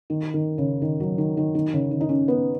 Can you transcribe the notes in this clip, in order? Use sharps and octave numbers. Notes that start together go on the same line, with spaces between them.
D#3
D#3
C#3
D#3
F#3
D#3
D#3
D#3
C#3
D#3
D#4
C#4
B3